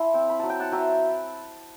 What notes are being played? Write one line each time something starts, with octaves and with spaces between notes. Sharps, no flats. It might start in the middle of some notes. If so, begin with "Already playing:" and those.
Already playing: E4 A5 C6
C4
B5
F#3 A5
G5
F#5 A5
F#3 E5 G5